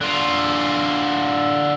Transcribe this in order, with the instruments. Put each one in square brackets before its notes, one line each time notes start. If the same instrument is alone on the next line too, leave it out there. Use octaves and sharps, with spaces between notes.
[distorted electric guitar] D3 F4